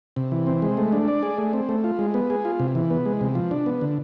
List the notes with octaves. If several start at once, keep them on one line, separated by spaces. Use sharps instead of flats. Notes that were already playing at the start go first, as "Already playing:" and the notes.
C3
E3
C4
G#3
A3
D4
D5
G#4
A3
C4
A3
F4
G#3
B3
G#4
F4
C3
E3
B3
G#3
C3
F3
D4
B3
D3